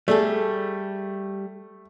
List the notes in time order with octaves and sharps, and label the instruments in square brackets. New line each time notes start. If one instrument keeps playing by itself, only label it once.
[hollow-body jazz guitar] G3 G#4 A4 [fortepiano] A3